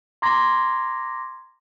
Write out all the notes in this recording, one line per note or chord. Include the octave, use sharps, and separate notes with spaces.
A#5 C6 D6 G#6 A#6